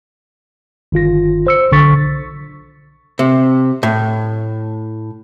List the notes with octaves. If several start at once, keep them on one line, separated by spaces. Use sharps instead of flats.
G1 D#3 F4 A#6
C5 E6 C#7
B1 D3 C#6 A6 B6
C3
A2